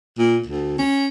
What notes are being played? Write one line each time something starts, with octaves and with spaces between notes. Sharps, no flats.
A#2
D2
C#4